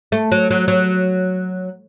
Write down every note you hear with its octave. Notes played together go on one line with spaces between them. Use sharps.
A3
F#3
F#3
F#3